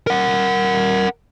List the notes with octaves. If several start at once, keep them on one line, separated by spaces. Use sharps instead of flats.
A#4 F#5